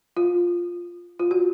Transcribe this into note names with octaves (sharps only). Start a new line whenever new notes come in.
F4
F4
F#4